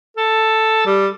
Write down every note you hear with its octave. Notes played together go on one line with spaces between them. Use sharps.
A4
G3